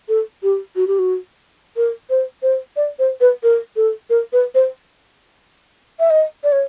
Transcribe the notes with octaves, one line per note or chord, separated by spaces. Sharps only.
A4
G4
F#4
G4
F#4
A#4
C5
C5
D5
C5
B4
A#4
A4
A#4
B4
C5
E5
D#5
D5
C#5